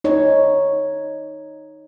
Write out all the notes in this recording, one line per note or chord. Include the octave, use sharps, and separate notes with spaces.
D#4 C#5